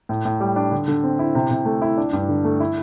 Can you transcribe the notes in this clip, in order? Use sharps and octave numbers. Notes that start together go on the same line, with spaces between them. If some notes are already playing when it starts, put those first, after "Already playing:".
A2
A2
G3
D4
D3
D3
C4
E4
C3
C3
A3
E4
D4
G2
D3
A3
E4